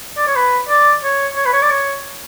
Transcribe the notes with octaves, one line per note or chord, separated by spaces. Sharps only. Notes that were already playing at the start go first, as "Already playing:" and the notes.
D5
C#5
B4
D5
C#5
C#5
B4
C#5
D5
C#5